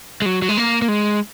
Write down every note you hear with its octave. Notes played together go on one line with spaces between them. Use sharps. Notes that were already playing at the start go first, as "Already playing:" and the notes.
G#3
F#3
F#3
G#3
A#3
A#3
G#3